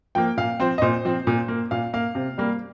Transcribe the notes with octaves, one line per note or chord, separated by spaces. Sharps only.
F3 A#3 G5
A#2 F5
F3 C4 C5
D#5
A#2 C5
F3 C4
A#2
A#3
A#2 F5
A#3 F5
C3
G3 A#3